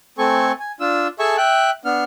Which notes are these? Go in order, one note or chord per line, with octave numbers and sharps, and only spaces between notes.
A3 C4 A4 G#5 C#6
G#5
D4 F4 E6
G#4 A4 E5 G#5 A5 C#6
E5 G5 F#6
B3 D4 F6